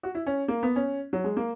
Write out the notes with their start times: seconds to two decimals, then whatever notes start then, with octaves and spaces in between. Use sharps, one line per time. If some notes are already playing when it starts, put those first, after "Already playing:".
0.03 F#4
0.15 E4
0.26 C#4
0.48 A#3
0.63 B3
0.76 C#4
1.13 F#3
1.24 G#3
1.37 A#3